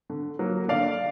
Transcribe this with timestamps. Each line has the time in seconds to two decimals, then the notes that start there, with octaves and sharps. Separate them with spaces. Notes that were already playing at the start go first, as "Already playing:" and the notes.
0.10 D3
0.39 F#3 A#3
0.68 D3 D5 F5